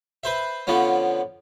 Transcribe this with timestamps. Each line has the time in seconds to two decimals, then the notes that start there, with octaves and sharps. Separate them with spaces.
0.23 B4 C5 E5
0.67 D3 F3 B3 C#4